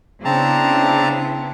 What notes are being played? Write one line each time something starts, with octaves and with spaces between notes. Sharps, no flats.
C#3 B3 C4 D4 E4 A5 A#5